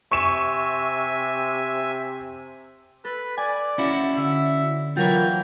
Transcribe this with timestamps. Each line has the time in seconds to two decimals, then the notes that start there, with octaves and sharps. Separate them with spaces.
0.12 C3 E5 G#5 C#6 E7
3.05 A4 B4
3.37 D5 G#5
3.78 C#4 E4 F#4
4.17 D3 E5
4.97 E3 F#3 F4 A#4 C#5 G5